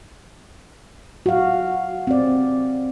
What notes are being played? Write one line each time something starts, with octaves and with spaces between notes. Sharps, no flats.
F#4 F5
C4 D5